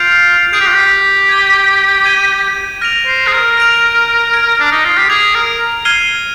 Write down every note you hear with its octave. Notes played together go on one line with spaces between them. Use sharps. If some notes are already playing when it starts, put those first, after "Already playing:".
Already playing: F4 G6 D7 F7
G#4 G6 D7 F7
G4
F4
G4
G#6 D#7 G7
G#6 D#7 G7
F6 A#6 D7 F7
C5
G#4
A#4
F6 A#6 D7 F7
G#6 D7 F7
D4
D#4
F4
G4
G#4 G#6 D7 F7
A#4
F6 G#6 C7 D#7 G7